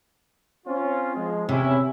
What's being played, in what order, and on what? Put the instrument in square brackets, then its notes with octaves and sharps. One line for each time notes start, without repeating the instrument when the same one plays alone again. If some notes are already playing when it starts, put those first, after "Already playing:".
[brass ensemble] C4 C#4 F4
F3 G#3
[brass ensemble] E2 C#4 E4 [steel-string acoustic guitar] C3